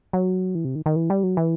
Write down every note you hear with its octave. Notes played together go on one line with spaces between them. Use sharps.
F#3
E3
C3
D#3
D#3
E3
G3
F#3
E3